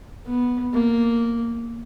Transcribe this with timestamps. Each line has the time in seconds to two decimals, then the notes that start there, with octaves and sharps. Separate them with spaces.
0.26 B3
0.73 A#3